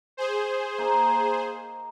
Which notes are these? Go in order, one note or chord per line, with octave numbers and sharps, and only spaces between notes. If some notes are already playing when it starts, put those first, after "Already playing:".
G#4 C5
A#3 D#4